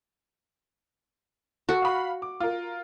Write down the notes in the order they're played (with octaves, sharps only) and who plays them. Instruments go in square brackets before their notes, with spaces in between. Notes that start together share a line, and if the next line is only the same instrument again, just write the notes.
[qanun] F#4 [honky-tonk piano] A4
[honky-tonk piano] F5 B5
D6
F4 A#4